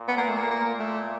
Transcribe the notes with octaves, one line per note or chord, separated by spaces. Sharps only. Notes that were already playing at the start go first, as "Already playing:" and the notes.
Already playing: A#2
B3
A#3
A3
A#3
A#3
A3